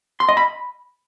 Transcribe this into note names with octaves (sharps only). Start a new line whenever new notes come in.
C6
D#5
B5